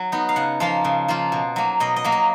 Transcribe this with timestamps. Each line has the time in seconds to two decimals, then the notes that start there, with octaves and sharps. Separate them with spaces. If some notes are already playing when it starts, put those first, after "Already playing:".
Already playing: F#3
0.12 B3 D#4
0.29 F5
0.36 C#3 F#5
0.60 F3 A#3 F4 F5
0.84 C#3
1.08 F3 A#3 F4
1.32 B2
1.56 F#3 A#3
1.80 B2 D#5
1.96 D#5
2.04 F#3 A#3
2.12 D#5